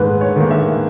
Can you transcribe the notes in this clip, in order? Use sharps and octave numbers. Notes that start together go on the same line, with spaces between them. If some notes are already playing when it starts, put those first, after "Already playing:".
Already playing: G#2 D#3 A#3 B4
C#5
D#3 A#3
E5